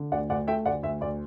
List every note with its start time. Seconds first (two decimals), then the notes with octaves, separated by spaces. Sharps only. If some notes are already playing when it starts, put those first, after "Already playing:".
Already playing: D3
0.12 D2 D5 F#5
0.30 D2 D5 F#5
0.47 A3 E5 G5
0.66 D2 D5 F#5
0.83 D2 E5
1.01 D2 D5